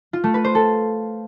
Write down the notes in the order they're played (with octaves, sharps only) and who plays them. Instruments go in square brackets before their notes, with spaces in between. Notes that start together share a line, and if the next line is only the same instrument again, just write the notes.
[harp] F4
A3
B4
C5
A4